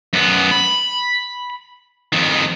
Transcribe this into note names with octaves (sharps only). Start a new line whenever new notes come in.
F#2 B3
B5
F2 D#3